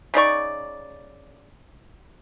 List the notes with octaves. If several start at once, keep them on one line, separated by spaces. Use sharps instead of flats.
C#3 D#4 D5 C#6